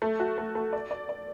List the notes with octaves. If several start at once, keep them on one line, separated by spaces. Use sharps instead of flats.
A3
F#4
A3
A3
D5
D5
D5